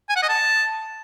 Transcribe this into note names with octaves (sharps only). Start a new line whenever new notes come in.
G#5
F#5
D#5
A5